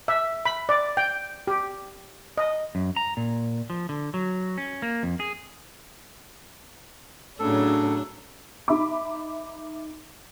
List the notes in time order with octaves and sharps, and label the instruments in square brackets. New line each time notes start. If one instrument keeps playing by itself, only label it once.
[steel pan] E5
B5
D5
G5
G4
D#5
[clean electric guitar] F#2
A#5
A#2
F3
D3
F#3
C#4
A#3
F2
G#4
[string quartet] A2 C#3 F#3 [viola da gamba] D4 [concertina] A4
[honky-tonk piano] D#4 E5 B5 D6